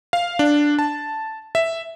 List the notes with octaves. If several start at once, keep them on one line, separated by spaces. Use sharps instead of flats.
F5
D4
A5
E5